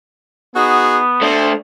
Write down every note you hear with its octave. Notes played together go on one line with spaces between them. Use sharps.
B3 D#4 F#4 G#4
A3 D4 C5